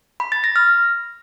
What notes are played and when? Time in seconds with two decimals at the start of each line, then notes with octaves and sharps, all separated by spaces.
0.20 B5
0.32 A6
0.44 A#6
0.56 F6